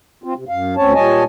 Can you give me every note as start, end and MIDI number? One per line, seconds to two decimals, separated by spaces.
0.24 0.34 60
0.24 0.34 65
0.36 0.44 48
0.49 0.75 42
0.49 0.75 77
0.77 0.94 38
0.77 0.94 60
0.77 0.94 61
0.77 0.94 73
0.77 0.94 81
0.95 1.24 46
0.95 1.24 55
0.95 1.24 73
0.95 1.24 75
0.95 1.24 80
0.95 1.24 81